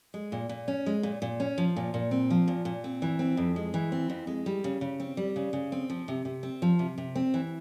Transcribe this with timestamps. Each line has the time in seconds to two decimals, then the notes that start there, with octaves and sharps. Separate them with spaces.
0.14 G#3
0.32 A#2
0.49 A#2
0.68 C#4
0.86 G#3
1.03 A#2
1.22 A#2
1.40 C#4
1.58 F3
1.76 A#2
1.94 A#2
2.11 C4
2.30 F3
2.48 A#2
2.65 A#2
2.84 C4
3.02 E3
3.19 C4
3.37 F2
3.56 G#3
3.74 E3
3.92 C4
4.10 F2
4.27 G#3
4.46 G3
4.64 C#3
4.81 C#3
5.00 C4
5.17 G3
5.36 C#3
5.53 C#3
5.72 C4
5.90 F3
6.08 C3
6.25 C3
6.43 C4
6.62 F3
6.79 C3
6.98 C3
7.16 C4
7.34 E3